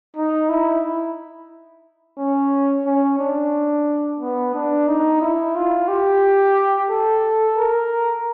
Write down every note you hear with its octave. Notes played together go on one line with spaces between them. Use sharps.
D#4
E4
C#4
C#4
D4
B3
D4
D#4
E4
F4
G4
A4
A#4